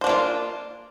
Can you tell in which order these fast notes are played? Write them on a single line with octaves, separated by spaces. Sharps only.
C5 D4 A#3 F4